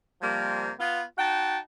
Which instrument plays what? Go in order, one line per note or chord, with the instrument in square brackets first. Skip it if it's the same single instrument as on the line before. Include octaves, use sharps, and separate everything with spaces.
[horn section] C3 F3 G3 A#3
B3 F4
D#4 F#4 F#5 G5 A5